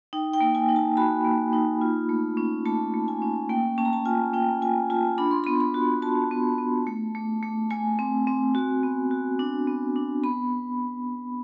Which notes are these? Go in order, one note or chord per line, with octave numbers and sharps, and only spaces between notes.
D#4 G5
G5
A#3
G#5
D#4
A5
F#4 B5
A#3
D#4
F4
A3
C#4
A3 A5
A3
G#5
C#4
A#3 G5
C#4 A5
A#5
A5
F4 G#5
C#4 G5
F4 G#5
F4 A5
D4 B5
C6
B3 B5
B5
F#4
F#4 A5
B3
B3
A3
A3
A3
A3 G#5
C4
C4
F#4
B3
F#4
D4
B3
D4
B3 B5